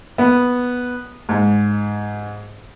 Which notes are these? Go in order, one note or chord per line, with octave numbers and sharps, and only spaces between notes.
B3
G#2